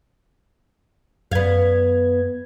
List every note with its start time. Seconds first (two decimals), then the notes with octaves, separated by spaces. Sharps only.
1.31 F#2 B3 F5 G#6